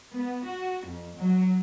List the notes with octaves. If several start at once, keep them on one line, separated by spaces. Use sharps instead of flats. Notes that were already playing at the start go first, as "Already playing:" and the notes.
B3
F#4
F2
F#3